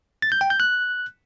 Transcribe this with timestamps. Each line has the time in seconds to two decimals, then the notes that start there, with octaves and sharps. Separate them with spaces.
0.22 A6
0.32 G6
0.41 G5
0.50 G6
0.60 F#6